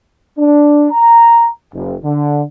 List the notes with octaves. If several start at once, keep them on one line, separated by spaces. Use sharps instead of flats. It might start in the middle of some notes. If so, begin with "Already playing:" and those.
D4
A#5
F#1
D3